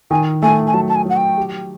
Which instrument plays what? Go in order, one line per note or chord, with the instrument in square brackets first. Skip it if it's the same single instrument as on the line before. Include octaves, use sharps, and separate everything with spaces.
[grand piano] D#3 [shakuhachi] G#5
[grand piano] A3 [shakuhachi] G#5
[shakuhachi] G#5
[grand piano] F#3 [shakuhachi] A5
[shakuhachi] A5
G#5
[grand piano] F#3 [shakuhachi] F#5
[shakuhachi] G5
[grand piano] G4